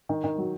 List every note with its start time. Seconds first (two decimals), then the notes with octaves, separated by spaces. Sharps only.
0.09 D#3
0.24 D#3
0.38 F#3